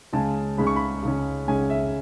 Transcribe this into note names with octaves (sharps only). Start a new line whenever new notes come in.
C#2 C#3 G#3 C#4 A5
C#2 C#3 G#3 C#4 B5
C#6
B5
C#2 C#3 G#3 C#4
C#2 C#3 G#3 C#4 G#5
E5